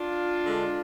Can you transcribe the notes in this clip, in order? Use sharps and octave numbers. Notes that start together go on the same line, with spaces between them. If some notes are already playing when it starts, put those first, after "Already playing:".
Already playing: D4 F4
D3 G#3